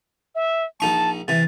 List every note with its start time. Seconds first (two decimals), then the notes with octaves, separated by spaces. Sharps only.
0.35 E5
0.80 A#1 D#4 A5 C#6
1.28 C3 E3 A6